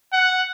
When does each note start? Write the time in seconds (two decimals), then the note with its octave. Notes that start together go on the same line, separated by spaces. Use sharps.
0.13 F#5